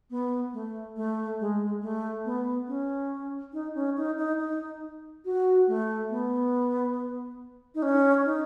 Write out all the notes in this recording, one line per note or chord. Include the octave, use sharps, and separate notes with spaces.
B3
A3
A3
G#3
A3
B3
C#4
D#4
C#4
D#4
D#4
D#4
F#4
A3
B3
D#4
C#4
D#4